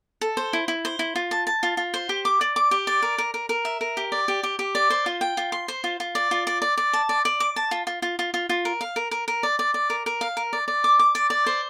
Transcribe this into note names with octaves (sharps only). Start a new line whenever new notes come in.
A4
C5
E4
E4
C5
E4
F4
A5
A5
F4
F4
C5
G4
D6
D5
D6
G4
D5
A#4
A#4
A#4
A#4
E5
A#4
G4
D5
G4
G4
G4
D5
C5
F4
G5
F4
C6
C5
F4
F4
D5
F4
D5
D5
D5
A5
D5
D5
D6
A5
F4
F4
F4
F4
F4
F4
A#4
F5
A#4
A#4
A#4
D5
D5
D5
A#4
A#4
F5
A#4
D5
D5
D6
D6
D5
D5
C5